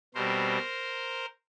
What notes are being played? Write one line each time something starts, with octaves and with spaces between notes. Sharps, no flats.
B2 G3 C4 A#4 C5